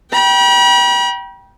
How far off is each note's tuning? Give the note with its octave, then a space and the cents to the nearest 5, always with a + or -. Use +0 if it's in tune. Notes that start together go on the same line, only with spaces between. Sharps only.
G5 -10 B5 -45